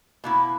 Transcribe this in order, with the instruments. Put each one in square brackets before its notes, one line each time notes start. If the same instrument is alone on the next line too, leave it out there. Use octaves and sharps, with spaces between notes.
[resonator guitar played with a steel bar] B2 A#3 E4